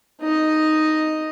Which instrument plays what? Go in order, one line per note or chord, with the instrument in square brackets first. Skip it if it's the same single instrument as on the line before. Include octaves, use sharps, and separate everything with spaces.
[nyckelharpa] D#4 D#5